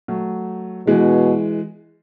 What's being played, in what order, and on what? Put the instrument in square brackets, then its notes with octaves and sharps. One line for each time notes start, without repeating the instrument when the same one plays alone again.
[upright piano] F#3 A3
[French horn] B2 [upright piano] E3 G#3